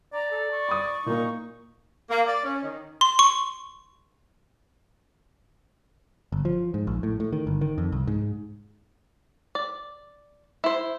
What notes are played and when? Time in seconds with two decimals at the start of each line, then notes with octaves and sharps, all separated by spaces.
0.13 D5 A#5
0.31 A4
0.51 C#6
0.69 B5 D#6
1.06 A#2 A#3 D#4
2.10 A#3
2.26 D5
2.44 C#4
2.62 D#3
3.01 C6
3.19 C#6
6.32 G1
6.45 F3
6.74 G#2
6.87 A#1
7.03 A2
7.20 A2
7.33 D#3
7.47 G1
7.61 D#3
7.78 F2
7.92 C2
8.07 G#2
9.55 D5
10.64 E4 C5